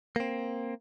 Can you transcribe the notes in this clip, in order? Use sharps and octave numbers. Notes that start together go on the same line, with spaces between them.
A#3 C4